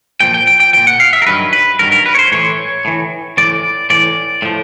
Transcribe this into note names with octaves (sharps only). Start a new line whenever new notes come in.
A#2 F3 G5
G5
G5
G5
A#2 F3 G5
F#5
F5
E5
A#4
G2 D#3 F#3 B4
B4
G2 D#3 F#3 A#4
A#4
B4
C#5
C5
A2 E3 C#5
A2 E3
A2 E3 D5
A2 E3 D5
A2 F3